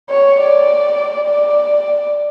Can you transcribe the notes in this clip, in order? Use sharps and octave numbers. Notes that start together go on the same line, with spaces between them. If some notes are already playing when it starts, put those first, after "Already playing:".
C#5
D5
D5